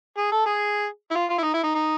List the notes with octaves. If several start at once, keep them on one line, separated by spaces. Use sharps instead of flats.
G#4
A4
G#4
E4
F4
F4
E4
D#4
E4
D#4
D#4